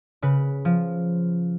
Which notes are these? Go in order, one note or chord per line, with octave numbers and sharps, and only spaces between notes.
C#3 B4
F3